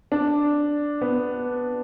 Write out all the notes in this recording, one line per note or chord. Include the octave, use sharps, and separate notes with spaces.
D4
B3